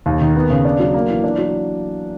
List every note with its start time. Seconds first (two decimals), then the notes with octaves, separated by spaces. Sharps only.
0.06 D#2
0.21 D#3
0.36 B3
0.50 C#3
0.65 D4
0.79 F#3
0.94 A#3
1.09 E3
1.24 D4
1.38 F#3